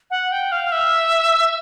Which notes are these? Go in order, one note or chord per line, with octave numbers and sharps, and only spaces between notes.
F#5
G5
F5
E5